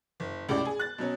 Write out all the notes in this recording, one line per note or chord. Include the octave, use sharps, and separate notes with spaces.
F#1
C#2 A2 G4 D5
G#4
F#6 A6
B2 F#3 C#4